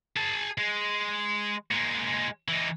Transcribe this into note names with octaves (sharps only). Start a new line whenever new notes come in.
G#4 A5
G#3
A#2 G#3
E3 D#4